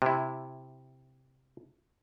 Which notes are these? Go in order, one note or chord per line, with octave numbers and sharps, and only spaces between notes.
C3 E4